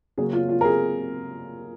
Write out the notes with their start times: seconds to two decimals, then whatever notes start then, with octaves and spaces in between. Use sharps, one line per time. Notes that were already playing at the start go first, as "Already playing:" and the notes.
0.18 C#3 F#3 A#3 C#4 G#4
0.33 F4
0.49 F4
0.61 A#4
0.65 G#4